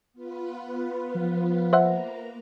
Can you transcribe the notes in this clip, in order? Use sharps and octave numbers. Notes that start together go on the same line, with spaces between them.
B3 F4 B4
F3
A#3 C5 E5 F#5 A#5